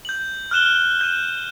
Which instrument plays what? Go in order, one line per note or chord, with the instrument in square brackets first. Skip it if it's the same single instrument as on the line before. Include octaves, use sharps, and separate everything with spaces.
[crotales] G6 F#7
F6 F#6 E7 G7
G6 D#7